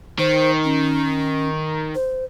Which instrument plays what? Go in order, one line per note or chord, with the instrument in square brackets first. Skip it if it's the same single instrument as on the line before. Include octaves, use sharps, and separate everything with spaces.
[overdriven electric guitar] D#3 [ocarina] C5
[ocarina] C#4
C5